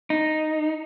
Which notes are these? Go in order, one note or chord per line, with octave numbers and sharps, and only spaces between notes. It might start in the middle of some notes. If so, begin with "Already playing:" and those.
D#4